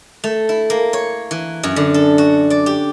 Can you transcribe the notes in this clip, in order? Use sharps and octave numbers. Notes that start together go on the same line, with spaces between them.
A3
E4
A#3
C#5
E3
F#2
D3
A4
F#4
D5
G4